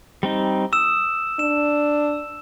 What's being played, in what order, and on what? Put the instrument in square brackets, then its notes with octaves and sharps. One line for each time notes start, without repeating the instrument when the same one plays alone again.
[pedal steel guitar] G3 C4 D#4
[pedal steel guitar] D#6 [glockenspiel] E6 E7
[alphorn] D4 [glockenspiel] E7